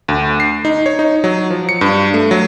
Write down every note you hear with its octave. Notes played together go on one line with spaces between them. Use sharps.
D2
C7
D#4
C#5
D#4
F#3
F3
C#7
G2
A3
F#3